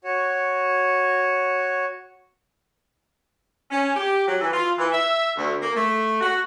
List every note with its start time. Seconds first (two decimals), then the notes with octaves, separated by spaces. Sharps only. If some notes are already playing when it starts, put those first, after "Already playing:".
0.04 F#4 C#5
3.71 C#4
3.96 G4
4.28 F#3
4.41 E3
4.53 F4
4.78 E3
4.92 E5
5.37 D2
5.62 A#3
5.76 A3
6.20 F#4